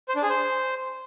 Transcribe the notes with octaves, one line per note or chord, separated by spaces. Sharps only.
C5
D4
G#4
C5